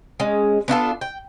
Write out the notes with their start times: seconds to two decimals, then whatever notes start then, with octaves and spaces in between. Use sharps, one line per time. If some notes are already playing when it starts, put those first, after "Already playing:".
0.20 G#3 C#4
0.68 B3 D4 F4 A4
1.01 G5